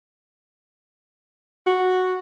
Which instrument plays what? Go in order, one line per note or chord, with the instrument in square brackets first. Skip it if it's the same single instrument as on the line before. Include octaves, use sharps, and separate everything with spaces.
[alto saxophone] F#4